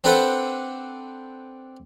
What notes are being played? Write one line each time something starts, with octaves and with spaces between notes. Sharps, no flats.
C4 D4 A4 B4 C5 F#5